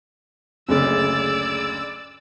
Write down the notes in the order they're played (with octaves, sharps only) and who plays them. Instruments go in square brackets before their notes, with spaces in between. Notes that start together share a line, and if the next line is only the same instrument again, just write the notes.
[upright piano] F#1 D2 C#3 [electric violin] D5 E6